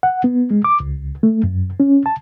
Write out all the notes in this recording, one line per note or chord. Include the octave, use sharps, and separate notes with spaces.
F#5
B3
G#3
D6
C#2
A3
F#2
C#4
A5